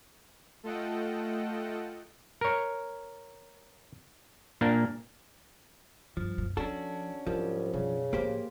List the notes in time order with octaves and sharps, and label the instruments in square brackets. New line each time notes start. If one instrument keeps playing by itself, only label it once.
[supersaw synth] A3 F4 A4 D#5 F#5 G5
[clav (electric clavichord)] A#4 C#5
A#2 A#3 D4 A#4
[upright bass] G2 [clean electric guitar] F3
[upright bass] F#2 A#2
[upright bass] F2 F3 [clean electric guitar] C#4 D4 F#4 [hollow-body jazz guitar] A4
[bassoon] C2 [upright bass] G#2 F#3 [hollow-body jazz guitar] F3
[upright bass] B1 F#2 [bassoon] C#3
[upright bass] A2 F3 [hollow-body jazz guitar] A#3 G4 C5